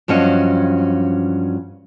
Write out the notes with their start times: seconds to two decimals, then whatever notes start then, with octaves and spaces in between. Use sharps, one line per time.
0.08 G2 F3 F#3 C#4 D#5